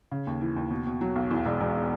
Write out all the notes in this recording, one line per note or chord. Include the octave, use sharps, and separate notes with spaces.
C#3
D#2
E3
D#2
B2
B2
F#3
B1
E2
E1
E1